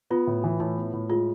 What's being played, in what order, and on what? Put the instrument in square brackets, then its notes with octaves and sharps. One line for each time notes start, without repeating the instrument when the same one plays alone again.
[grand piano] B3 [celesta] F4
[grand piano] A2
E3
[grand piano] A2 [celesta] E4
[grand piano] B3
A2
[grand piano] G#3 [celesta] F4